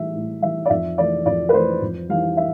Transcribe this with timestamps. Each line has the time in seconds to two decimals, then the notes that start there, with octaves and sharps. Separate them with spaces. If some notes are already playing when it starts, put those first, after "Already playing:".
Already playing: A2 E3 G3 E5
0.15 A2
0.42 E3 G3 E5
0.65 D5
0.70 F2 E5
0.98 E3 A3 D5
1.26 F2 D5
1.49 B4
1.53 E3 A3 C5
1.82 F2
2.09 E3 G3 F5
2.37 E5